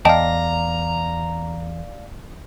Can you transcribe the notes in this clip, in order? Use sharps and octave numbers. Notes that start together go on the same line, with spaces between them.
E2 D5 D#5 F5 G5 A5 A#5